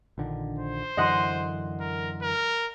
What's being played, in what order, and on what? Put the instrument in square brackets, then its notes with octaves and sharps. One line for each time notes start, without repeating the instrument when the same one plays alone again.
[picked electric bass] A#1 D3 D#3
[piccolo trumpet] C5
[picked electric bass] F#2 D3 E3 [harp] D#5 F#5 C6
[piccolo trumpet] A#4
A#4